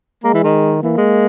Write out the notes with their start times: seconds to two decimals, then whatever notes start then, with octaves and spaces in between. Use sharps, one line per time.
0.24 G#3 A#3
0.34 E3
0.43 D#3
0.83 E3 A#3
0.98 G#3